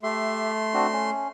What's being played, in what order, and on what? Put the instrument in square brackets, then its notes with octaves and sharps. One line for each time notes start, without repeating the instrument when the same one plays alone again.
[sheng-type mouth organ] A3 C6 [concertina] G4 E5
[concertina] C4 D4 F#4
C#4